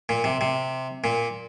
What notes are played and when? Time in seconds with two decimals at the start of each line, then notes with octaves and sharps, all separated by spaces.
0.09 A#2
0.24 C3
0.41 C3
1.04 A#2